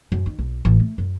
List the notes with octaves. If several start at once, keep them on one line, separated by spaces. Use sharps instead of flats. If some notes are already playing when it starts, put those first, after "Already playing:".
F#2
D#3
B1
A1
A3
F#2